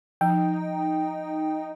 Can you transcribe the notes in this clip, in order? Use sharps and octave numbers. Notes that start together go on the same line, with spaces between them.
F3 D#4 G5